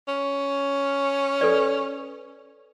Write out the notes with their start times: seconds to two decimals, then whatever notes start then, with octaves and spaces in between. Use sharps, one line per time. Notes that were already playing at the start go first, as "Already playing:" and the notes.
0.08 C#4
1.41 A4 B4 D5